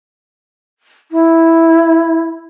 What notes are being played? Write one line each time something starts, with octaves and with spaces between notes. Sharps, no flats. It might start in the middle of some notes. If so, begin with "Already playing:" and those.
E4